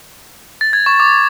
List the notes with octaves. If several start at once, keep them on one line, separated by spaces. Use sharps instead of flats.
A6
G#6
C#6
D6